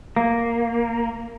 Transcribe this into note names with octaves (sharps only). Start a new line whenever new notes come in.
A#3